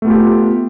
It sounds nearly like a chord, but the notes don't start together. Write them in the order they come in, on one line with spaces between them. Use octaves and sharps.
A3 B3 F4 G4